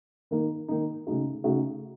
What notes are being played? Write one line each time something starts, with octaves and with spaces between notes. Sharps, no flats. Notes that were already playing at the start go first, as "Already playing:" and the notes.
D#3 A#3 D#4
D#3 A#3 D#4
C#3 A3 D#4 F#4
C#3 A3 D#4 F#4